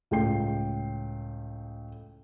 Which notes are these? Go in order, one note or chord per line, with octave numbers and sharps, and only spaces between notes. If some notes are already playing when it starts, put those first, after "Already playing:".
C#2 A2 G5 C7